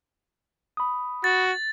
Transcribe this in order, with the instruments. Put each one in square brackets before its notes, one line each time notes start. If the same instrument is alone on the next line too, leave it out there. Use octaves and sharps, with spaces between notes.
[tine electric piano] B5 D#6
[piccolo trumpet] F#4 [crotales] A6